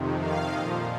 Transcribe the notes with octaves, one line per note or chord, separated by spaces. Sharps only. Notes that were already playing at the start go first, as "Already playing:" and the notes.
Already playing: F2 C3 D#3
F5
A#2 F3 D#5